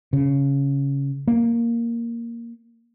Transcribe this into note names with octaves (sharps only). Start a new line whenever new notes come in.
C#3
A#3